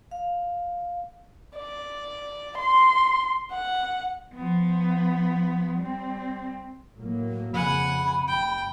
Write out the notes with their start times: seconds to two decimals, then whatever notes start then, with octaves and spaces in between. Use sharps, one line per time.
0.11 F5
1.58 D5
2.58 C6
3.52 F#5
4.34 F3 B3
5.78 G3 C4
6.96 A2 F#3 A#3
7.54 F2 C#3 F#5 G#5 B5
8.28 F#1 G5